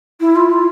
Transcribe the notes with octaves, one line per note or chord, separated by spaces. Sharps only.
E4
F4
F4